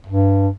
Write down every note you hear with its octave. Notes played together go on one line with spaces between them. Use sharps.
G2